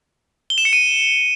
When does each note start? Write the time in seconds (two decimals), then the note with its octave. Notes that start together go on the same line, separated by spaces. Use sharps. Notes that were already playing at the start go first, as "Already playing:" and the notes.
0.50 G7
0.58 E7
0.65 C#7
0.73 D#7